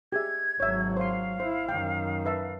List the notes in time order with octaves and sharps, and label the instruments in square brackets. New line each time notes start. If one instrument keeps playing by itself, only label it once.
[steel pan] G4 G#4 E5 [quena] G#6
[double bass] G#1 F#3 [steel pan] C#5 E5
[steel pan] C5 C6 [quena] F5
[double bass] E4 [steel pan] C5
[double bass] F#2 D#3 [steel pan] G5
[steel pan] B4 E5 A5